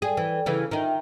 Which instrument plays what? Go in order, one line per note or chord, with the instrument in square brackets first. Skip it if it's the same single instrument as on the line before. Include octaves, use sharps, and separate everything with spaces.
[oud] G#4 [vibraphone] A4 D5 G5
[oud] E3
[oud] C#3 E3 [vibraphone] A4
[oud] D#3 D#4 [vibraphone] F4 E5 G5